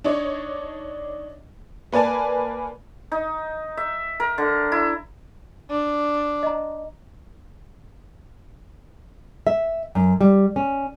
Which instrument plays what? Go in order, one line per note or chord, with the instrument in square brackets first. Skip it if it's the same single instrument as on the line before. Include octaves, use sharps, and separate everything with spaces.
[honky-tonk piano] D4 D#4 C#5
A#3 B4 D5 G#5 A5
[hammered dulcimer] D#4
E5
A#4
D3
E4
[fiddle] D4
[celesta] D#5 A#5
[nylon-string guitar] E5
F#2
G3
C#4